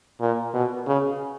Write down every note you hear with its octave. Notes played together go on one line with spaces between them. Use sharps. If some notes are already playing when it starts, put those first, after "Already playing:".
A#2
B2
C#3